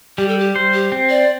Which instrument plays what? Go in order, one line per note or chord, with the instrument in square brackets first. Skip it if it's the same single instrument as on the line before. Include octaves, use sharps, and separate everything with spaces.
[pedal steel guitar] G3 [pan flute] G4
[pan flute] A4
G4
[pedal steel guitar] C5
[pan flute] G4
[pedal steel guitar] C4
[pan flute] D5